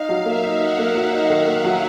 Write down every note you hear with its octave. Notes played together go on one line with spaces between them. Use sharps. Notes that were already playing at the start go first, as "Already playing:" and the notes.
Already playing: D#4 F5
F#3
A#3 E5
D#4
D#4 F#5
A#3
F#3
D#4
D#3
A#3
F#3